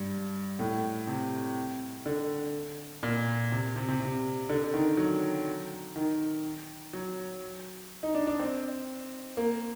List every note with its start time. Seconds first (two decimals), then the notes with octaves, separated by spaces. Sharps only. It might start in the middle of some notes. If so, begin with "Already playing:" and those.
Already playing: G2
0.59 A2
1.07 C3
2.06 D3
3.03 A#2
3.52 C3
3.76 C3
3.89 C3
4.00 C3
4.49 D3
4.74 D#3
4.97 F#3
5.96 D#3
6.93 F#3
8.03 D#4
8.15 D4
8.27 D4
8.39 C4
9.37 A#3